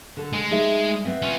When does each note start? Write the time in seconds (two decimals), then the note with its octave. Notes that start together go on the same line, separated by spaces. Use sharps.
0.17 D3 A4
0.33 G#3
0.51 D#4 G#4 E5
1.05 B3 C4 E5
1.22 C#4 F4